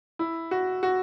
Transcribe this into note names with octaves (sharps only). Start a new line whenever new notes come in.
E4
F#4
F#4